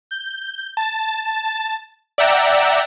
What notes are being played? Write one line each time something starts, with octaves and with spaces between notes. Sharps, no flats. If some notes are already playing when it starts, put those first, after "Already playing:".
G6
A5 A6
D5 E5 F#5 G5 A#5 E6